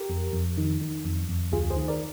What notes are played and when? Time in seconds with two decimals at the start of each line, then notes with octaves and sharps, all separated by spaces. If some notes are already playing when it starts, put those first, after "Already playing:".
Already playing: G4 A#4
0.10 F2
0.33 F2
0.57 D#3
0.81 D#3
1.05 F2
1.29 F2
1.52 D2 F4 G#4
1.70 G#4 C5
1.76 D#3
1.88 A#4 D5